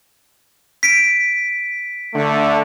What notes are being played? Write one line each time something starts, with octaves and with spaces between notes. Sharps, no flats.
B6 D7
D3 A3